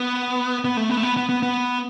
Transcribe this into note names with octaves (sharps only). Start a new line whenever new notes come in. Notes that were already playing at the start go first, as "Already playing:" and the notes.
Already playing: B3
B3
A3
B3
A3
B3
B3
B3
B3